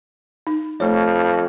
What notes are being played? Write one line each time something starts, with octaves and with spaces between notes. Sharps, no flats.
D#4
F2 A3 C#5